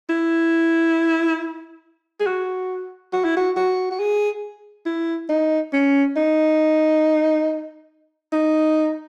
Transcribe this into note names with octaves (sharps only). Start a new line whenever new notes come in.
E4
G#4
F#4
F#4
E4
F#4
F#4
F#4
G#4
E4
D#4
C#4
D#4
D#4